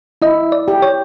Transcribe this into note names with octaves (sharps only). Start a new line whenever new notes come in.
E4 D#5
D5
G4
C#5